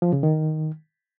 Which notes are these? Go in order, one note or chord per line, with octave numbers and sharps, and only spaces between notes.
F3
C#3
D#3